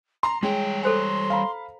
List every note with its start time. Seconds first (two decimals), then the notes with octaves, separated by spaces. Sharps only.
0.23 A#5 C6
0.43 G3 G#3 C#5 G5
0.83 A4 C5 G#5 C6
1.30 F5 A#5 B5